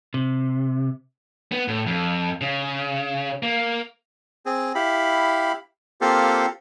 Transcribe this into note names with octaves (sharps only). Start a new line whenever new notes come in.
C3
B3
A2
F2
C#3
A#3
C4 G#4
E4 G4 F5 B5
A#3 C4 F4 G4 A4 F5